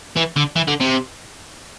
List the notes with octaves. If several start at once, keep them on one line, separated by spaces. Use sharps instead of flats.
E3
D3
E3
D3
C3